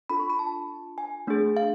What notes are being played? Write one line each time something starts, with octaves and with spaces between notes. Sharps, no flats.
D4 F4 A4 B5
C#6
B5
A5
G#5
A3 D4 G#4
F5